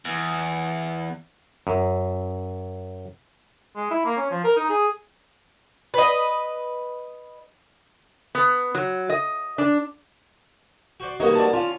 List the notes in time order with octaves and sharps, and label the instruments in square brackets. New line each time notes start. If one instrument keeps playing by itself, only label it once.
[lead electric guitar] E2
[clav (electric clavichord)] F#2
[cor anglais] G#3
E4
A#3
C#4
F3
A#4
D#4
G#4
[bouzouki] B4 D#5
[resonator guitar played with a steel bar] B3
F#3
D#5
D4
[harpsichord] F#4 C5 D5
[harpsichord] G3 F#4 C#5 [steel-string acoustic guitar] A#3 B3 D#4 [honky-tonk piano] D#5
[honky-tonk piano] D5 A5
[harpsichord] C#4 [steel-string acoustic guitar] F4